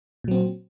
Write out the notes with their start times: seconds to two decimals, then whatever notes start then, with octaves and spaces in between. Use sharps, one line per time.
0.24 A#2
0.28 F#3
0.31 C4